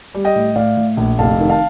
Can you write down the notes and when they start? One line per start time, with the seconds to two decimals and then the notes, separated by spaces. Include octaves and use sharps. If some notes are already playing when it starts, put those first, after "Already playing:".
0.14 G3
0.25 D#5 G5
0.36 A2
0.56 A2 D5 F5
0.77 A2
0.97 A#1
1.19 F1 F5 A5
1.40 D#3
1.49 F5 A5